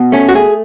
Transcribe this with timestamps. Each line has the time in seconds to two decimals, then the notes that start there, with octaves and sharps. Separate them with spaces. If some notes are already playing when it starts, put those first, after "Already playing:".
Already playing: B2
0.12 A3 C#4
0.29 F#4
0.34 A3 G#4